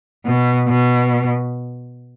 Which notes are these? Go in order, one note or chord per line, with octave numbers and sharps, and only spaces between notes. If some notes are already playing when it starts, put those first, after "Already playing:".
B2
B2